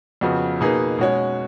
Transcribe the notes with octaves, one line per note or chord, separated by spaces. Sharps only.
F2 C#3 F3 B3 F#4
B2 A#3 D#4 G#4 B4
B2 G#3 C#4 F#4 C#5